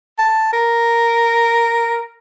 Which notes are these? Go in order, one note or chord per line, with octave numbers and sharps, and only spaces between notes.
A5
A#4